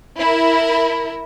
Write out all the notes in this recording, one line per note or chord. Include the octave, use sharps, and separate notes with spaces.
E4 A#4